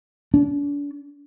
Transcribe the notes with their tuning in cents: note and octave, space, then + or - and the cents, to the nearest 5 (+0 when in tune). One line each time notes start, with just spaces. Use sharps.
D4 -40